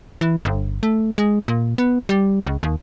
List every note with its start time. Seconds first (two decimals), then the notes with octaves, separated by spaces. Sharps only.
0.21 E3
0.45 G1
0.83 A3
1.18 G#3
1.48 A#2
1.78 B3
2.09 G3
2.47 C#2
2.63 D#2